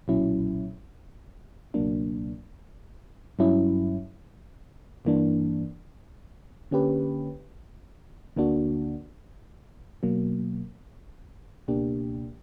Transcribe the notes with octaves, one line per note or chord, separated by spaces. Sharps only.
B1 A#2 F#3 C#4 E4
C#2 B2 F#3 A#3 D4
G2 F#3 C#4 E4
G2 E3 A#3 D4
D3 A#3 C#4 G4 B4
D2 D3 A#3 D4 F#4
B2 F#3 A#3
C#2 B2 A#3 D4 G4